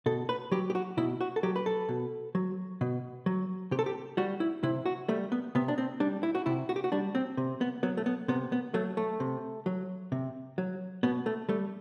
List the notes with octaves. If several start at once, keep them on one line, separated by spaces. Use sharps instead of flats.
B2 A4
B4
F#3 G4
G4
F#4
B2 E4
F#4
A4
F#3 G4
B4
A4
B2
F#3
B2
F#3
C3 G4
A4
G4
G3 F#4
E4
C3 E4
F#4
G3 A3
B3
C3 B3
D4
C4
G3 D4
E4
F#4
C3 E4
F#4
G4
F#4
G3 D4
C4
C3
B3
F#3 B3
A3
B3
C3 B3
B3
F#3 A3
A3
C3
F#3
C3
F#3
B2 B3
A3
G3 A3